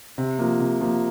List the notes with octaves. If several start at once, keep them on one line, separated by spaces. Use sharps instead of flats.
C3
F3 A#3
C3
F3 A#3